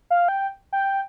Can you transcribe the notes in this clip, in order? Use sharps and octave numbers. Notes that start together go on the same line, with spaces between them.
F5
G5
G5